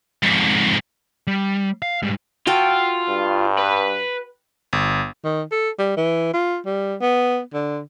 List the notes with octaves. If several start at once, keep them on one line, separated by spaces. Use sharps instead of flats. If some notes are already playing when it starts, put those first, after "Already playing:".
F2 G#2
G3
F5
G#2 G3
F4 F#4 A4 G5
G2
B4
G1
D#3
A4
G3
E3
F4
G3
B3
D3